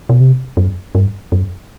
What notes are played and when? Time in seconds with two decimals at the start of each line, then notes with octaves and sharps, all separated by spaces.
0.09 B2
0.20 C3
0.57 F#2
0.95 G2
1.32 F#2